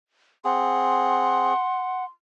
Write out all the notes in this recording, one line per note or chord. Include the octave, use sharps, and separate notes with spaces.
C4 G#4 F#5 C6